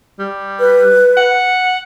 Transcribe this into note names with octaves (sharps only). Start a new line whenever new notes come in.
G3
B4
F#5